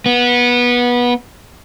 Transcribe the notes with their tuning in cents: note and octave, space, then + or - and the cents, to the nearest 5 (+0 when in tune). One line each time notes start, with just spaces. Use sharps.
B3 -20